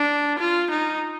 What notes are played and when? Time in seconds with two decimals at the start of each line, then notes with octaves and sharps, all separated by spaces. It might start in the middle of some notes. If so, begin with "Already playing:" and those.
Already playing: D4
0.39 F4
0.70 D#4